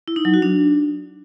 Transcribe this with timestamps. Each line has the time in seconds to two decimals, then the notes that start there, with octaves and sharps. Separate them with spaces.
0.08 E4
0.16 D#4
0.25 F#3
0.34 F#4
0.42 D4